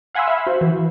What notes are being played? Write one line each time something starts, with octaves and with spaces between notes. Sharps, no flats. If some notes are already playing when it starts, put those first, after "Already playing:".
F5 F#5 G#5 B5 C6 E6
E5 F5 B5
F#4 C5
E3